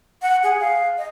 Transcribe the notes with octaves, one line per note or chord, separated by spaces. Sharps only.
F#5
G#4
F5
D#5